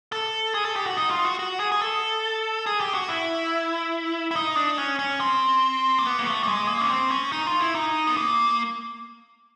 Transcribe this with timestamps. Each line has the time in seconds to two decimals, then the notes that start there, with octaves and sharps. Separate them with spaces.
0.12 A4
0.54 G#4
0.65 A4
0.76 G4
0.86 F#4
0.97 D#4
1.11 F4
1.25 F#4
1.39 F#4
1.60 G#4
1.72 G#4
1.82 A4
2.66 G#4
2.80 G4
2.94 F#4
3.09 E4
4.31 E4
4.36 D#4
4.56 D4
4.78 C#4
4.99 C#4
5.20 C4
5.99 A#3
6.05 B3
6.19 A#3
6.26 A3
6.43 G3
6.48 G#3
6.68 A#3
6.80 C#4
6.90 C4
7.11 C#4
7.32 D#4
7.47 F4
7.61 E4
7.75 D#4
8.07 B3
8.17 A#3